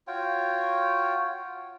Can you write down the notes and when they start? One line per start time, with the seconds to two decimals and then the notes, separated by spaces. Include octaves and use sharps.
0.07 F4 F#4 C#5 G5